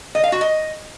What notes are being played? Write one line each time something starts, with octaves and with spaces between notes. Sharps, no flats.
D#5
F5
F#4
D#5